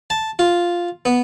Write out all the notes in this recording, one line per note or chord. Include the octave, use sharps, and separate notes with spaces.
A5
F4
B3